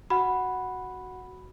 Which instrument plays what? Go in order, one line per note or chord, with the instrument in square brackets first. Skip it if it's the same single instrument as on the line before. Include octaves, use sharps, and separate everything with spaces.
[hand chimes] F#4 F#5 [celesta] B5